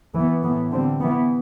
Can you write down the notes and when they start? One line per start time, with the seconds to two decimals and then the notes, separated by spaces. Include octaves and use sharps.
0.14 E3 B3
0.43 A2 E3 B3
0.73 D3 G3 C4
1.01 E3 B3